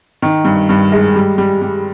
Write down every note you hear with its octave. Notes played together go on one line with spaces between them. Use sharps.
D#3
G2
G2
G#3
G3
G3
G3